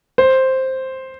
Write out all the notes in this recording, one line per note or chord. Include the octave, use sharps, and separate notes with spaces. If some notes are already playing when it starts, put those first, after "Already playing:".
C5